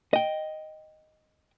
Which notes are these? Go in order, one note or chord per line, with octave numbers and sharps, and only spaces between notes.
D#5 G5